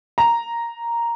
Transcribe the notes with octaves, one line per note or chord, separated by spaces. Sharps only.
A#5